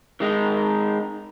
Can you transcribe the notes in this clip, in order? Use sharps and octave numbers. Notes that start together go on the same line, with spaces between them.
D#3 G#3 D#4